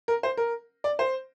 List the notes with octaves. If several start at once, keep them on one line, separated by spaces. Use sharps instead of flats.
A#4
C5
A#4
D5
C5